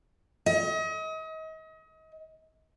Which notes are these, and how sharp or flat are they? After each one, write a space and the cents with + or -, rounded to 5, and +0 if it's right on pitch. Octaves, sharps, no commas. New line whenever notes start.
D#5 +35